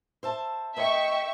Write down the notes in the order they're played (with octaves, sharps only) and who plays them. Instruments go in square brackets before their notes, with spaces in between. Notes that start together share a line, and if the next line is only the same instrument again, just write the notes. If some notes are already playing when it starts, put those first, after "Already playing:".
[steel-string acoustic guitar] C5 E5 A5
[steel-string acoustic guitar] A3 D#5 [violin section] E5 G5 C#6